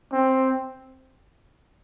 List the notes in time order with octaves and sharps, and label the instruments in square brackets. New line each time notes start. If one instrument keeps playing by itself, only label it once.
[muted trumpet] C4